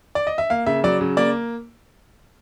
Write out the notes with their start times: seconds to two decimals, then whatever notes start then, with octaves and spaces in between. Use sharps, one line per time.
0.15 D5
0.27 D#5
0.38 E5
0.50 A#3 F5
0.66 C#3 E5
0.84 F#3 D5
1.01 C#3
1.17 A#3 D5